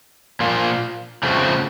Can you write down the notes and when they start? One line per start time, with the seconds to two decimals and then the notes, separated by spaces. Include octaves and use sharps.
0.40 A#2 F3 A#3 F4
1.23 C#3 F3 A3 C4 F#4